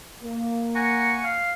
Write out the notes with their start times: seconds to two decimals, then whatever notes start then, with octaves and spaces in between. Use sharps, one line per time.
0.22 A#3
0.75 F#5 G#5 A#5 C#6
1.24 F5